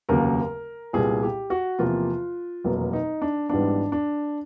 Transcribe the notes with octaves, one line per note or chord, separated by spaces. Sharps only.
F1 D#2 C#3 F#3 A#3 A#4
C2 A#2 G3 B3 G#4
G4
F#4
E2 C3 F3 A#3 F4
F1 E2 B2 F#3 A#3
D#4
D4
G#1 G#2 E3 G3 B3 D4
D4